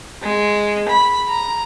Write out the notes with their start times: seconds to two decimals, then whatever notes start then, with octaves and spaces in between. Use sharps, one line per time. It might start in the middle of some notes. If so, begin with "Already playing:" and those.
0.22 G#3
0.89 B5
1.29 A#5